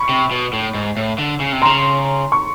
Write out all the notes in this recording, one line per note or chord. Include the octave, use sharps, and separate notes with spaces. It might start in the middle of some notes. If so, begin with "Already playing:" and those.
Already playing: B5 C#6
C3
B2
A2
G#2
A2
D3
C#3
C3
C#3 A#5 C6
C#6